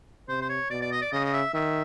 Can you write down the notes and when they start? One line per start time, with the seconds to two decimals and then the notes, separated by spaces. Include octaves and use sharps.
0.28 C3 C5
0.41 C5
0.49 C#5
0.71 B2 D5
0.81 D5
0.92 D#5
1.02 D5
1.12 C#3 D#5
1.25 D#5
1.33 E5
1.54 D#3 E5